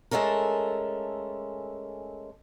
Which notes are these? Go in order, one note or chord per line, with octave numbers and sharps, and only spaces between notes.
G#3 A3 C#4 A4 A#4